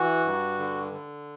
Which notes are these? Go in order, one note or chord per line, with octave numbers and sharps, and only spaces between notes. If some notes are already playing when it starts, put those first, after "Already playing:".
Already playing: E3 F#4
G2
D3
D3